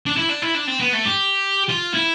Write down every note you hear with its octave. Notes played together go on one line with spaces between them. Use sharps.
D4
E4
D4
E4
D4
C4
B3
A3
G4
F4
E4